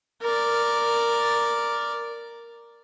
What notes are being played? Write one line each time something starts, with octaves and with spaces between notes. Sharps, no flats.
A#4 D5